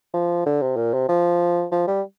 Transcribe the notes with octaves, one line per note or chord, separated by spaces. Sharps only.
F3
D3
C3
A#2
C3
F3
F3
G3